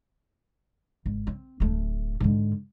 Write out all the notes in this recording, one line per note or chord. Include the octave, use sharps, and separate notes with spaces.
G#1
C4
D1 A3
G#2 D3